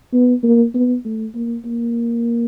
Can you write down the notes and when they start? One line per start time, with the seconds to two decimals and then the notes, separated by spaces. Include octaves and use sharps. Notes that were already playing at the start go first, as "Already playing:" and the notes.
0.13 B3
0.43 A#3
0.74 B3
1.05 A3
1.35 A#3
1.65 A#3